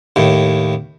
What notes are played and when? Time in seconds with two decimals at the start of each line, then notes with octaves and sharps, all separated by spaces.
0.16 D#2 A2